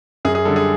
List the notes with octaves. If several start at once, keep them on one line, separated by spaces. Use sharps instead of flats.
F#2 G#4
G#4
D3 G3 A4
G#4